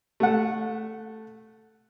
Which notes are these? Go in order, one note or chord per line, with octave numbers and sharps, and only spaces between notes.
A3 F#5